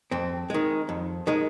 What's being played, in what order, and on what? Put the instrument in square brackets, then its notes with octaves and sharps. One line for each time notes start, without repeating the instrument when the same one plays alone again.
[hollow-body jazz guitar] F2 C4
D#3 G#3
F2
D#3 G#3